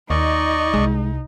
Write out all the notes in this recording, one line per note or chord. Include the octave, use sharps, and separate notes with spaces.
D#2 D#4 D5 D#5 C#6
C2 G#3